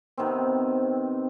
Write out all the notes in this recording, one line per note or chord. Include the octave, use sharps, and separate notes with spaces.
C3 D#3 B3 C4